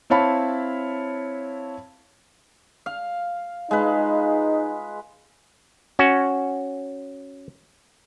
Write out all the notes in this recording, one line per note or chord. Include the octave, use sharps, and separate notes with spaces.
C4 E4 C#5 F5 A5 B5
F5
G#3 D#4 F4 B4
C#4 F#4